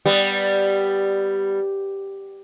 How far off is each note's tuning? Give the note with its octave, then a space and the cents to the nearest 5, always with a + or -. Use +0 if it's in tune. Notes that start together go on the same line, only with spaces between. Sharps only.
G3 +0 B3 +10 G4 +0